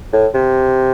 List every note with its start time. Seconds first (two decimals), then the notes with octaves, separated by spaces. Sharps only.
0.12 A2
0.34 C3